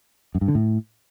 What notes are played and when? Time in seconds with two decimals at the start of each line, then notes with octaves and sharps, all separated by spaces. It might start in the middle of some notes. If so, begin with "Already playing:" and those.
0.35 F#2
0.41 G2
0.48 D3
0.55 A2